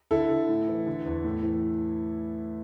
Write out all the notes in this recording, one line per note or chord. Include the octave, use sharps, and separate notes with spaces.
D3 E4 A4
D3
A2
E3
D3
E2
A2
E3